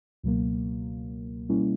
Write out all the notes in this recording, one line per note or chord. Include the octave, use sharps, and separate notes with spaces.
C#2 B2 F#3 A#3
B2 G3 A#3 C#4 E4